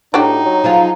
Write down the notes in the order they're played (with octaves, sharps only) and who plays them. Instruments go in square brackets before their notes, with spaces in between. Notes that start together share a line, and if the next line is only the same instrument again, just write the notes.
[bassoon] A2 [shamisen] D4 F#4 G4 [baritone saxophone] D#4
[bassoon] F#3
[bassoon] F3 [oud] F#3 F4 G#4